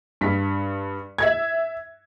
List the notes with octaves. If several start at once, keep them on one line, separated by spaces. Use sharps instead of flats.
G2 B6
E5 G#6